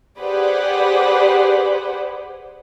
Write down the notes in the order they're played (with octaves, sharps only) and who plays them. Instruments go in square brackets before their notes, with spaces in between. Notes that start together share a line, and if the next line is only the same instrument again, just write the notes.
[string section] G4 G#4 B4 C5 D5 F#5